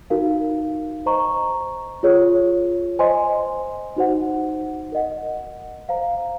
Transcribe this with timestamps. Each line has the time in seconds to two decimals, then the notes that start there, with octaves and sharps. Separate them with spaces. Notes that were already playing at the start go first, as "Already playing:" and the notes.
0.10 D#4 F#4 A#4 F5
1.06 C5 D#5 A#5 C#6
2.03 F4 G#4 C#5
2.99 C5 D#5 G#5 C6
3.96 D#4 F#4 C5 F#5
4.92 A#4 D#5 F#5
5.89 C5 F5 A#5